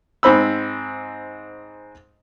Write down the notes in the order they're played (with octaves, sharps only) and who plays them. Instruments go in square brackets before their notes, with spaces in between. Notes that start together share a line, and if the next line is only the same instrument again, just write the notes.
[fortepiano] G#2 C4 B5 E6